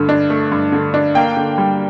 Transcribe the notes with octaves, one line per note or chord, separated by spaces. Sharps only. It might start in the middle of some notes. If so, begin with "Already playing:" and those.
Already playing: G2 D3 A3
D4
A3
G2
D3
D4
A#3 G5
D3
G3